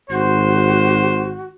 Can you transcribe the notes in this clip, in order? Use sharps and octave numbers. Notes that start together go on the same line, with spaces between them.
G#1 F#4 C5